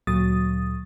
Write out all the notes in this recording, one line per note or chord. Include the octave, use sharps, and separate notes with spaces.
D2 A#2 F#3 D#6 A6